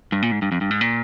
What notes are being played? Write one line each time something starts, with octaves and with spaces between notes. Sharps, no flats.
G2
A#2
G#2
G2
F2
G2
G#2
A#2